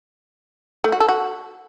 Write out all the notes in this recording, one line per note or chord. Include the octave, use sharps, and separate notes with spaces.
A3
F#4
A4
F#4